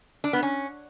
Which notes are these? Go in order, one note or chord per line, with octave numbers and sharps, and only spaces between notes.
D4
B3
C#4